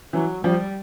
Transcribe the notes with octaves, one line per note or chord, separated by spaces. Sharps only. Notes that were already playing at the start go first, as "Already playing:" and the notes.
E3 F#3
F3 G3